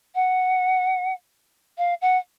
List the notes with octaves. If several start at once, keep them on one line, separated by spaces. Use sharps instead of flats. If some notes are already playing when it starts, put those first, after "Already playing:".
F#5
F5
F#5